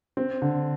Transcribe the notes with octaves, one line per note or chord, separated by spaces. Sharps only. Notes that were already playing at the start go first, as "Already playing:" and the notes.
C4
D3